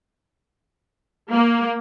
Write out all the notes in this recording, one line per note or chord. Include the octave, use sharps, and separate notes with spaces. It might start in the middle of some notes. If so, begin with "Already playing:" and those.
A#3